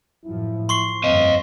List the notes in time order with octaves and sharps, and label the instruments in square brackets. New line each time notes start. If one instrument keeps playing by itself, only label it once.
[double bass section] F#2 A2 F3 [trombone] E4
[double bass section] F3 [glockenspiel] C6 C#6 C7
[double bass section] G1 F2 [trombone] C4 [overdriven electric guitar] D#5 F5